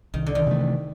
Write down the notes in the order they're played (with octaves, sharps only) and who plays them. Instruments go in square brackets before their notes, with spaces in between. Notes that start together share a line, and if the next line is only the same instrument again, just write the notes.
[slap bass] C2 [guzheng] D#3
[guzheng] D3
D#3
[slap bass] C3 E3 A3